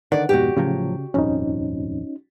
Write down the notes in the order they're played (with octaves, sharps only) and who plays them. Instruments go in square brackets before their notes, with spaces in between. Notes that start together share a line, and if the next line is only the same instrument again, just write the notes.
[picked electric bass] D3 D#3 [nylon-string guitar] D5 [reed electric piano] F#5
[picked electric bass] F2 G#2 B2 [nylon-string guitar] F#4 G4
[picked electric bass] A2 F3 F#3 [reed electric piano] C#3
[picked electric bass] D#1 G#1 F2 [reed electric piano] C#4 D#4